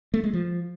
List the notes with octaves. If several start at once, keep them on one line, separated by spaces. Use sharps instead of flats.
A3
G#3
F3